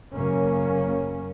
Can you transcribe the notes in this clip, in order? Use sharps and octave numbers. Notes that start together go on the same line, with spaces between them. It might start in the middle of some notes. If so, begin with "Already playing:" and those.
F#2 C#3 A#3 C#4